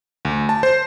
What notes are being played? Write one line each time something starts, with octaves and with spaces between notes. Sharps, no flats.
D2
A5
C5